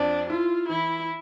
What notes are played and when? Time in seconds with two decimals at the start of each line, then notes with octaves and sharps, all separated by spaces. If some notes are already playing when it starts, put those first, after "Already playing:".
Already playing: F2 D4
0.30 E4 F4
0.69 E3 E4